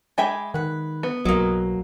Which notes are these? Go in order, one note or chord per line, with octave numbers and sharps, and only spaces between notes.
G#3 E5 G5 G#5 B5 D6
D#3 B4 F#5
B3
B1 F#3 A#3 D#5